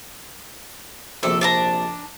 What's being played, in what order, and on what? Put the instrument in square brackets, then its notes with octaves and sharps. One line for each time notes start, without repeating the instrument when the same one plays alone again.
[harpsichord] A#1 C3 [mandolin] A4
[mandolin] D4 A5 A#5